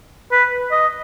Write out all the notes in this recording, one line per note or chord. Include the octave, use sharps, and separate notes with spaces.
B4
D#5